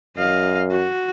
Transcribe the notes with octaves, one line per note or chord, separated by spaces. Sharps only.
F#2 D#5 F5
F#4